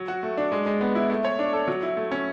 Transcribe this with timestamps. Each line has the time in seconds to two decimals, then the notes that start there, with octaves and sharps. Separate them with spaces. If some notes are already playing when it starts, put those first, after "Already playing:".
Already playing: F#3
0.08 F#4
0.23 A3
0.38 D4
0.52 G#3
0.66 G#3
0.81 B3
0.95 E4
1.10 A3
1.25 C#5
1.39 D4
1.53 A4
1.68 F#3
1.83 E4
1.97 A3
2.11 C#4